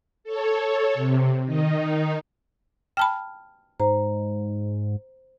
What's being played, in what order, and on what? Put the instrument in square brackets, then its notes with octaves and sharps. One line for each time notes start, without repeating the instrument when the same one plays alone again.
[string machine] A4 C#5
C3
D#3 D#4
[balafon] G5 A5 B5 [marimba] F6
[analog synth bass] G#2 [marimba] C5 A#5